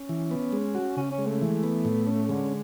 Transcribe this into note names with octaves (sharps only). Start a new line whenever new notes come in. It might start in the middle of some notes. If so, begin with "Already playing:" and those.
Already playing: C#4
E3
B3
G#3
F#4
C#3 C#4
C#4
G#3
A3
E3
B3
A2
C#4
D3 G#3